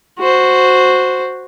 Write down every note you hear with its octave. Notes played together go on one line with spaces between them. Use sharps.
F#4 C5